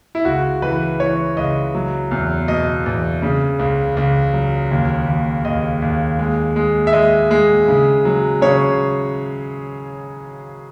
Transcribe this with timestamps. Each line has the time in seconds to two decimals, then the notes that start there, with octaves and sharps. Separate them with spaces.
0.15 E4
0.25 C#2 F#4
0.62 E3 B4
1.00 E3 C#5
1.37 C#2 D#5
1.75 F#3
2.11 E2
2.48 B2 D#5
2.86 E2
3.22 C#3
3.59 C#2
3.97 C#2
4.33 F#3
4.71 D#2
5.08 D#2
5.45 D#2 D#5
5.82 D#2
6.19 G#3
6.56 G#3
6.87 E5
6.93 G#3 D#5
7.31 G#3
7.68 C#3
8.05 F#3
8.42 C#3 C#5